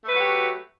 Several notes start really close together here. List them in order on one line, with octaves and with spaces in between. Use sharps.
A3 B4 F#3 F#4 G4